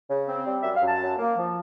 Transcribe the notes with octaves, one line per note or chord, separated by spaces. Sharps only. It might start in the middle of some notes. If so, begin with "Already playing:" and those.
C#3
C4
G3
F#2 E5
F5
F#2
A5
F#3
A#3
F3